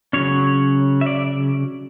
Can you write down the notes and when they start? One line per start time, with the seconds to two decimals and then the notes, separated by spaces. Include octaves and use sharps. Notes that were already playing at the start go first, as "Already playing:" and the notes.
0.13 C#3 F#3 C#4 C#5
1.01 E5
1.06 D5